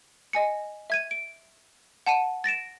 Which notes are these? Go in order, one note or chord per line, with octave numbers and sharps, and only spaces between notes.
D#5 G#5 C#7
E5 G#6 D#7
D7
F#5 A5 C#7 D#7
A6 A#6 D7 E7